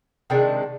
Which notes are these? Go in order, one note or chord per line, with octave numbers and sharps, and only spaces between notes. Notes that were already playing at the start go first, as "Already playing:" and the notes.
C3 D#3 G#3 D4